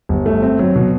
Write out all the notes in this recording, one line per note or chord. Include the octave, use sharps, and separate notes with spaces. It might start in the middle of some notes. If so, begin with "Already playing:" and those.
G1
A3
C4
F#3
B2